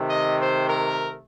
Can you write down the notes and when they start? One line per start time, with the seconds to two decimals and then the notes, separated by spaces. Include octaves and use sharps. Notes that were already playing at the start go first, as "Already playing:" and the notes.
Already playing: C3 D#3 A3
0.09 D#5
0.39 C5
0.68 A#4